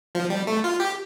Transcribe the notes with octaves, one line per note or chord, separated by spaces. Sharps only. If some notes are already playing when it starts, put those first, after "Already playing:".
F3
G3
A3
F4
G4